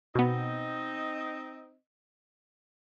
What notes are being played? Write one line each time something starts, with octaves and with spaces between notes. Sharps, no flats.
B2 B3 C4 D#4 D#5